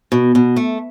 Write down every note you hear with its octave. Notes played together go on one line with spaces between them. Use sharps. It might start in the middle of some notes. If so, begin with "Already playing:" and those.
B2
B2
A3